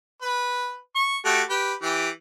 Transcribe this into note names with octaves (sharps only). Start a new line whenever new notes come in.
B4
C#6
A3 F#4 G4
G4 B4
E3 G4